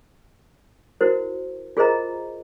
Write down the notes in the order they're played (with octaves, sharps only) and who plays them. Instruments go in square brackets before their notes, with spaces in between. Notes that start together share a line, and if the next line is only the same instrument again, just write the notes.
[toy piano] E4 F#4 A#4 C5
F4 G#4 A#4 C5 D#5 A#5